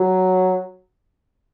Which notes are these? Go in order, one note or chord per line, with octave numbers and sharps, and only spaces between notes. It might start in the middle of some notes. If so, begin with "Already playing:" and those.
Already playing: F#3